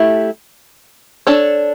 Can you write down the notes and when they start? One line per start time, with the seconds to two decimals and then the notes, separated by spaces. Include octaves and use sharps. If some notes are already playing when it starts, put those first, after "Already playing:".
Already playing: A3 E4 G4
1.27 D4 A4 C#5